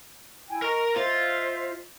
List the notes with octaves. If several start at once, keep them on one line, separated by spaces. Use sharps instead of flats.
E4 G5 G#5
A#4 D#5 A#5 C#6
F4 C5 D#5 E5